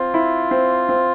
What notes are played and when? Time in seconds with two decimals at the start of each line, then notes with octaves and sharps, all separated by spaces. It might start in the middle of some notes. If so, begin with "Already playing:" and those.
Already playing: C4 F4
0.14 E4
0.51 C4
0.89 C4